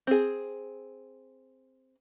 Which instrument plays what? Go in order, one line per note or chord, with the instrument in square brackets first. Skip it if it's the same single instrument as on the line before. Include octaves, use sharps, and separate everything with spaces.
[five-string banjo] C4 G#4